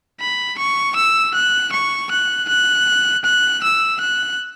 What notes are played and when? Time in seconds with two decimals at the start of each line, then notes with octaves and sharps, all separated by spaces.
0.20 B5
0.58 C#6
0.96 E6
1.34 F#6
1.72 C#6
2.11 F#6
2.48 F#6
3.25 F#6
3.63 E6
4.01 F#6